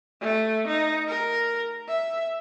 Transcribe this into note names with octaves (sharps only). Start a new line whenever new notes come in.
A3
D#4
A#4
E5